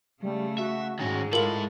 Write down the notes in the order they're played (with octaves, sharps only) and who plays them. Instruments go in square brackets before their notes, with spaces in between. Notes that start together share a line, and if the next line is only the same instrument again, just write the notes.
[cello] C#3 A3 [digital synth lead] G3
[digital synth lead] F#4 [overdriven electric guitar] E5
[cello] G#2 G#3 [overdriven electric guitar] D#3 F#4 [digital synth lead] C#4
[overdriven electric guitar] E4 A4 [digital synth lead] F4 [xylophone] A#4 F#7